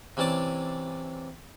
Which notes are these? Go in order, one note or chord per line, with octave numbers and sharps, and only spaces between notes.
C3 E3 C#4 D5 A5 D6